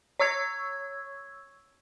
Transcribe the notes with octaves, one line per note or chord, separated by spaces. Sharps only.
C#5 C#6 E6 G#6